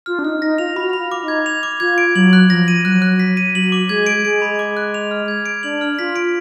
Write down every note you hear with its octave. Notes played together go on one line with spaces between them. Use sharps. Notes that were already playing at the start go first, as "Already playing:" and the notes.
F4 F6
D4
D#4 F6
D#4 A#6
F4 F7
F#4 B5
B5
F4
D6
D#4
G#6
F7
D6
F4 G#6
D7
F#3 F#7
F#6
F3 A#6
D#7
F#3 F#6
F#6
B6
D#7
F#3 F#7
D6
G#3 G#6
D7
G#3 D7
B5
D6
F#6
F7
F6
G#6
D7
D4 F#7
F6
F4 B6
D7